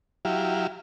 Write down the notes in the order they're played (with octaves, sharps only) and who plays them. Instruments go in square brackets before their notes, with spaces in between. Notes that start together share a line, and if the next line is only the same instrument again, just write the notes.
[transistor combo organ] F#3 E4 G4 F5